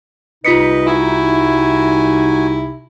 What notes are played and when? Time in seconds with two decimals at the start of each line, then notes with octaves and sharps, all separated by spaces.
0.45 C2 C3 D#4 F4 B4 D#5 B6 C#7
0.87 E4 F#4 G#5